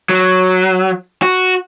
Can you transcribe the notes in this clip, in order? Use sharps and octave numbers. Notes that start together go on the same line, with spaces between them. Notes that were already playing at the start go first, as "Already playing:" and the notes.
F#3
F#4